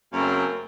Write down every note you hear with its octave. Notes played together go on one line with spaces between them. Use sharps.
F#2 C#3 A3 A#3 C4 A#4